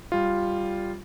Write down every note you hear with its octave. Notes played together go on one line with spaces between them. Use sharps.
G3 F4